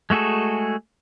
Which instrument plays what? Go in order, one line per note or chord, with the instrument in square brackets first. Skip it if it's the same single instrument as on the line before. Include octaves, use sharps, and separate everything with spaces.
[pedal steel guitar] G#3 A3 F#4 G#4 A4